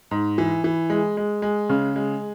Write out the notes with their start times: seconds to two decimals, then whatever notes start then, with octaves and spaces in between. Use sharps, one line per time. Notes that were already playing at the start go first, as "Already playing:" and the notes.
0.11 G#2
0.38 E3
0.64 E3
0.90 G#3
1.17 G#3
1.42 G#3
1.70 C#3
1.96 G#3